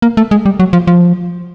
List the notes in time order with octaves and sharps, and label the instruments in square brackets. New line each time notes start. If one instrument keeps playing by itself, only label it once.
[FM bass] A#3
A3
G#3
G3
F#3
F3
F3